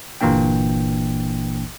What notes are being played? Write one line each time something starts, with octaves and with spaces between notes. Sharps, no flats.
G1 A#2 E3 A#3 D4 G5